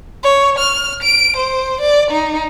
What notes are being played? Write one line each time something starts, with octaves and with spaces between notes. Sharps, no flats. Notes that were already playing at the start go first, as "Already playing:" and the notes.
C#5
F6
D7
C5
D5
D#4